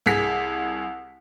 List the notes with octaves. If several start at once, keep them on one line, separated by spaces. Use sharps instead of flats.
C2 G#4 B6